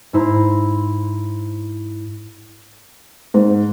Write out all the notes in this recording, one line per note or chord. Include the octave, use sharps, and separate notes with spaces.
G#2 E4 C5 A#5
G#2